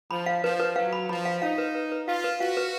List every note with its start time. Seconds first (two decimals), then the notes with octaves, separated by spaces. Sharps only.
0.10 F3 B5
0.26 F5
0.43 F3 B4
0.60 B4
0.76 F#3 F5
0.93 B5
1.09 F3 B5
1.25 F5
1.42 D#4 F5
1.58 B4
1.75 B4
1.92 B4
2.07 F4 F5
2.24 B4
2.40 F#4 F5
2.57 B4